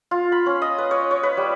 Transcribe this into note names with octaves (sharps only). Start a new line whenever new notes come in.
F4
B5
C#4
D#5
B4
C#5
C#5
B4
G3